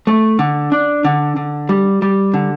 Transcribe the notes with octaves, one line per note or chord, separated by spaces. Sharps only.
A3
D3
D4
D3
D3
G3
G3
D3